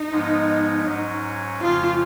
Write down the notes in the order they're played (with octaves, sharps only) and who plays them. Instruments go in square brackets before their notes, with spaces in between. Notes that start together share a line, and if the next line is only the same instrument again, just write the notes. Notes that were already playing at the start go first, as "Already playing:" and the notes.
Already playing: [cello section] D#4
[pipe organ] G#2 F3 G#3 B3
G#2 F#3 C#4
[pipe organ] F2 C#3 F3 [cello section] F4